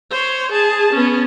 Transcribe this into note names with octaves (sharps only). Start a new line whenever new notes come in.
C5 C#5
G#4 A5
B3 C#4